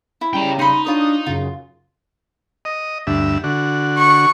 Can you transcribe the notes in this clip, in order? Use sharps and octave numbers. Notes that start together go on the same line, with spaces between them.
E4
C#3 G3 G5 A#5
D#4 B5 C6
D4 F4 C#5 D#5 D#6
F#2 C#3 F4
D#5
D2 G2 E5
D3 F#4
C#6